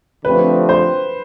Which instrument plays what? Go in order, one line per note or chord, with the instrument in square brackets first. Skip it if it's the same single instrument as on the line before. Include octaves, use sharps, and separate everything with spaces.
[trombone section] D3 F3 A3 C4 G4 [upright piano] B4
[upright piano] C5